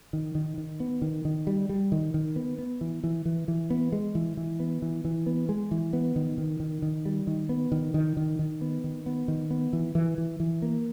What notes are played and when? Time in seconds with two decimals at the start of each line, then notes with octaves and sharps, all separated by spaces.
0.13 D#3
0.35 D#3
0.58 D#3
0.80 B3
1.02 D#3
1.25 D#3
1.47 G3
1.69 G3
1.92 D#3
2.14 D#3
2.36 B3
2.58 B3
2.81 E3
3.04 E3
3.25 E3
3.48 E3
3.70 B3
3.92 G#3
4.15 E3
4.37 E3
4.60 B3
4.82 E3
5.05 E3
5.26 B3
5.49 G#3
5.71 E3
5.93 B3
6.16 D#3
6.38 D#3
6.60 D#3
6.82 D#3
7.05 G3
7.27 D#3
7.49 B3
7.72 D#3
7.94 D#3
8.17 D#3
8.39 D#3
8.61 B3
8.84 D#3
9.06 B3
9.28 D#3
9.51 B3
9.73 E3
9.95 E3
10.18 E3
10.40 E3
10.62 A#3